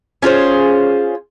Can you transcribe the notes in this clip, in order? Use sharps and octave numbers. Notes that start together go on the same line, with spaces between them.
C#4 F4 G#4 C5